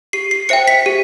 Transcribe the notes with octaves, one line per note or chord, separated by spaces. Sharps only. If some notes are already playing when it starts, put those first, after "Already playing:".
G4 C7
C7
C5 E5 G5 C#7
B6
G4